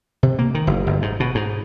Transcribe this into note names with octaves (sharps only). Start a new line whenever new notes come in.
C3
A#3
D#3
F#1
G1
G#2
B2
G#2